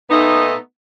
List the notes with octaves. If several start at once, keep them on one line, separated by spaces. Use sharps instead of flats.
A#2 A3 B3 D#4